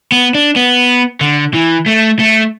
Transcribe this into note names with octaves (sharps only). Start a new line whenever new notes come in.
B3
D4
B3
D3
E3
A3
A3